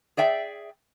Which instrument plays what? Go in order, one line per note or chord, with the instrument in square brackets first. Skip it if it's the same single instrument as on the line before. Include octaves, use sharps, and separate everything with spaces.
[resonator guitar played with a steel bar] G#4 D5 E5 G5